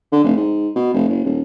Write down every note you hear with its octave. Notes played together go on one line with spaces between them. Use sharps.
D3
F1
G#2
B2
F1
F#1
D#1